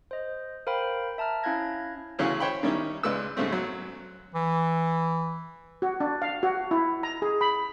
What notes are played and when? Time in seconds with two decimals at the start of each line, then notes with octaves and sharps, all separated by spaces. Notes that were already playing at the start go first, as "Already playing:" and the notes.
0.11 C5 D#5
0.67 A#4 C5 F5 G5 B5
1.18 E5 A5 A#5 F6
1.43 C#4 E4 F5 F#6 G#6 A#6
2.19 D2 C#3 E3 F#3 C#4 F5
2.40 C5 C#5 G5 B5
2.63 D#3 G3 C#4 D#4 E4
3.03 C#2 G#3 B4 D5 E6
3.37 G#2 C#3 G3 A3 C4
3.51 F#2 F#3
4.35 E3
5.82 F#4
6.00 D4
6.22 F5
6.43 F#4
6.71 E4
7.03 A#5
7.22 G#4
7.41 B5